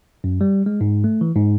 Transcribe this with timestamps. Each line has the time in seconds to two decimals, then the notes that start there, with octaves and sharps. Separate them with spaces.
0.24 F#2
0.41 G3
0.66 G#3
0.81 G#2
1.04 A3
1.21 E3
1.35 G#2